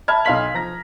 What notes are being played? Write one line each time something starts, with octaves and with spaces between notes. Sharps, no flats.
E5 A5 B5 F6 G#6
B1 D#5 F5 C6 B6 F#7
F3 A#5 A#6